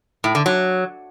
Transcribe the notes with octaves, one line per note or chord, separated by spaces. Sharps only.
A2
D3
F#3